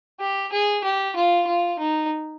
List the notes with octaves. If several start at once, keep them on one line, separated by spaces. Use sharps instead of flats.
G4
G#4
G4
F4
F4
D#4